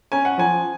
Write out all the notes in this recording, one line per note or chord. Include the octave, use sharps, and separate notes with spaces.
C#4 G#5
F#5
F3 G#5